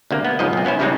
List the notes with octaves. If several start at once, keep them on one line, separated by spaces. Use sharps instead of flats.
D2 C3 A#3
B3
C#2 G#2 F3 D#5
B1 C4
B3 C#4 E4 C5
A2 C#3 G3 G#3 C4 D#4